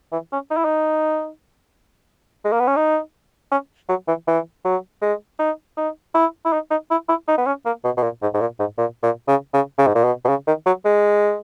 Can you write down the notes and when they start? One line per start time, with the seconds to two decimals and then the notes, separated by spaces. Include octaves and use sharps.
0.12 E3
0.32 C#4
0.50 D#4
0.57 E4
0.64 D#4
2.44 G#3
2.52 A#3
2.60 B3
2.67 C#4
2.76 D#4
3.51 C#4
3.89 F#3
4.07 E3
4.27 E3
4.65 F#3
5.02 G#3
5.39 D#4
5.77 D#4
6.14 E4
6.45 E4
6.53 D#4
6.71 D#4
6.91 E4
7.09 E4
7.28 D#4
7.38 B3
7.46 C#4
7.65 A#3
7.84 B2
7.97 B2
8.03 A#2
8.22 G#2
8.34 G#2
8.40 A#2
8.59 G#2
8.77 A#2
9.03 A#2
9.28 C#3
9.53 C#3
9.78 C#3
9.87 G#2
9.95 A#2
10.04 B2
10.25 B2
10.29 C#3
10.47 D#3
10.66 F#3
10.85 G#3